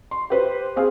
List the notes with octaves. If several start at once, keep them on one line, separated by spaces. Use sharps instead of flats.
C6
G4 B4 C5
C4 G#4 F5